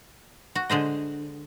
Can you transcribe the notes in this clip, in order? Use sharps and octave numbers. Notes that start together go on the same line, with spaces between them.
F#4
D3 G#3 C5 D#5